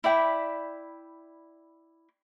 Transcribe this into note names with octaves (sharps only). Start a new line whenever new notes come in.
E4 D5 G5 B5